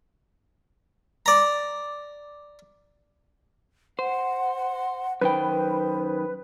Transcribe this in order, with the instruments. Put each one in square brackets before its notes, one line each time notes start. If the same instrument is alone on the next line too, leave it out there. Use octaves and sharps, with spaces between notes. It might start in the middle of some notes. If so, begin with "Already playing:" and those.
[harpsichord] D5 A#5
[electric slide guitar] C5 [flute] F#5
[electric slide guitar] F#2 D#3 G5 [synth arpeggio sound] B4 [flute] C5